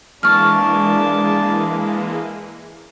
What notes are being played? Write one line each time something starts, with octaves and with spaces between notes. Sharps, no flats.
E3 G#3 A#3 D4 A5 C#6 F6